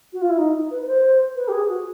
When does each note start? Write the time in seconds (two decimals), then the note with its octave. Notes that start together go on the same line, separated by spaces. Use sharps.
0.13 F#4
0.22 F4
0.30 E4
0.38 D#4
0.71 B4
0.82 B4
0.87 C5
1.36 B4
1.48 G4
1.52 G#4
1.68 F#4